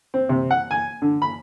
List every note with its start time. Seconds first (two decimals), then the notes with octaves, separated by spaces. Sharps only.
0.14 C4
0.29 C3
0.51 F#5
0.71 G#5
1.02 D3
1.22 B5